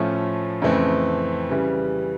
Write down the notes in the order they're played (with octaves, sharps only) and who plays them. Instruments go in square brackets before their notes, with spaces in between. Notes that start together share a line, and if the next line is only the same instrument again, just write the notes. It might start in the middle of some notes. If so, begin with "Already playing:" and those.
Already playing: [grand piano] A2 F3 A3 C#4 F4
F2 C#3 E3 A3 C4
C#3 E3 G3